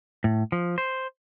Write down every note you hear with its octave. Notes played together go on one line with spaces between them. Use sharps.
A2
F3
C5